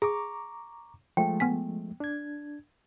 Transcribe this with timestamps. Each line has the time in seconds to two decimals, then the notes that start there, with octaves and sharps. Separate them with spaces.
0.02 G#4 A#5 C#6 D6
1.17 F3 G#3 A3 G5
1.40 B3 G#5 B6
2.00 D4 G#6